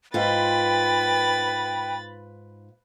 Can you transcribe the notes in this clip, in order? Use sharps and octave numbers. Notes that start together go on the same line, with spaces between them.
G#2 F4 B4 G5 B5 A6